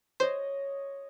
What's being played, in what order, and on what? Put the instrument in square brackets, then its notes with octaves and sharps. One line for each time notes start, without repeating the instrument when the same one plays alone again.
[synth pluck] C5 [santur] C#5 D#5